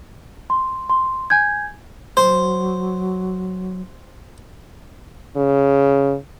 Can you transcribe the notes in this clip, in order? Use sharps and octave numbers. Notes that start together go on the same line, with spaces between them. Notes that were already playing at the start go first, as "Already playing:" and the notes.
C6
C6
G#5 G6 G#6
F#3 C5
C#3